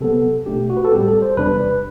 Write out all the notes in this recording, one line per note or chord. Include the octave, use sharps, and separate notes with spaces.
C3 F#3 B3 A4
B2 A3 D4 G4
F#4
B4
A4
A2 G3 C4 G4
A4
C5
E2 C3 G3 D4 B4